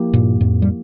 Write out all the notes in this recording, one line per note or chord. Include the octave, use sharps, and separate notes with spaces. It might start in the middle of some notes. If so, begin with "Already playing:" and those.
Already playing: F3 A#3 E4 G4
G2 A#2
F2 A2
G3